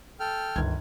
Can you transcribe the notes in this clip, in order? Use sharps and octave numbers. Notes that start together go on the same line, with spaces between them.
A4 G5 F6
G1 C#2 D#3 G#6